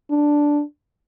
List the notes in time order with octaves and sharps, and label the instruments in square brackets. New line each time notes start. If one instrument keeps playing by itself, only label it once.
[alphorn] D4